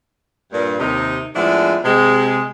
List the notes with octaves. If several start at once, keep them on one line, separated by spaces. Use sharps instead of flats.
G2 A#2
D#2 C3 D#4
A2 F3 G#3 B3 D4 E4
C3 G#3